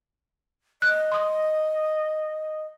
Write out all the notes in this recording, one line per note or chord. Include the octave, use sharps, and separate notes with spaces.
D#5 F#6
C6 D#6